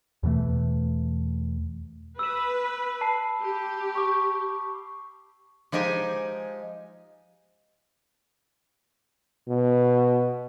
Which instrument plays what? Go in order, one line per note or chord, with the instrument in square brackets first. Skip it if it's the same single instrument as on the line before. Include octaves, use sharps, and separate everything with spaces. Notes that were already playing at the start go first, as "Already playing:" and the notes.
[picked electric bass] E2 B2 E3 A3
[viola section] B4 [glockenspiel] E6 E7
[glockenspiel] A5 B5 C7
[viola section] G4
[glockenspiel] C#6 D6
[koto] F3 G#3 D#4 G4 G#5
[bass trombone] B2